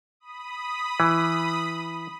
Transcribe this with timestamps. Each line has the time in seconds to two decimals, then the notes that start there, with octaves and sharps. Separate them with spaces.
0.20 B5 D#6
1.00 E3